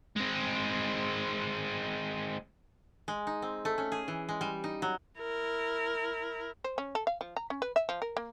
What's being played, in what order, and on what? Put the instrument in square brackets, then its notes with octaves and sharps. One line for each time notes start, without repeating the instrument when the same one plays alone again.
[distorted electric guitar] G#3 C4
[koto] G#3
D#4
C4
A3
C#4
G#4
E3
G#3
G3
D#4
F#3
[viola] E4 A#4
[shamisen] C5
C#4
A4
F5
F3
A#5
C#4
B4
E5
F3
A#4
A#3